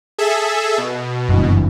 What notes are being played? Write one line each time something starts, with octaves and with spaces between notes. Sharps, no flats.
G#4 A4 E5
B2
F#1 G2 E3